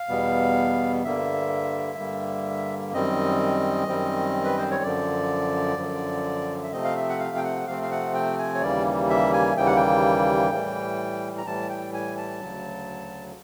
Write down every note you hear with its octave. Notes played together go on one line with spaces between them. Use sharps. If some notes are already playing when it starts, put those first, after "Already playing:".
Already playing: F5
E2 B2 G3 B3
G2 D3 G3 A#3 E5
G2 D3 G3 A#3
F#2 D#3 G3 C4 D#5
F#2 D#3 G3 C4
B4
C5
C#5
F#2 D3 F3 D5
F#2 D3 F3
E5
C3 F3 A3 C4 D#5
F5
E5
F#5
F5
G5
F#5
C3 F3 A3 C4 F5
F5
F#5
G5
G#5
C#5
D#2 C#3 E3 G3 A#3 D5
E5
G#5
D#2 C#3 E3 G3 A#3 G5
F#5
G5
A2 E3 G3
A#5
A2 E3 G3 A5
G5
G#5
A5
D2 C#3 F#3